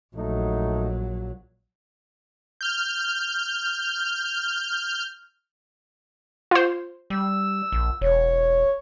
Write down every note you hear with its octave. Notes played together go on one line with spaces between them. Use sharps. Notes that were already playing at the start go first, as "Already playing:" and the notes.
A#1 F#3 A3 D#4
F6 G6
F4 C5
G3 E6
A#1
E1 C#5